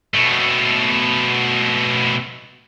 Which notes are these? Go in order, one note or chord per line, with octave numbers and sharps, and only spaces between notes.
B2 A3